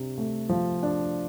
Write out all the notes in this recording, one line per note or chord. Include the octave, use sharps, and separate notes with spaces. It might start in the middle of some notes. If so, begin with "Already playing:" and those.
Already playing: C3 D4
A3
F3
D4